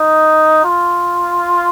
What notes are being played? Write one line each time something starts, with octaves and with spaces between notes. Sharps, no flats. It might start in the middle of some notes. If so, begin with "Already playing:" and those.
Already playing: D#4
F4